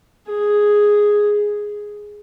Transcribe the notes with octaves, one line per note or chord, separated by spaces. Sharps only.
G#4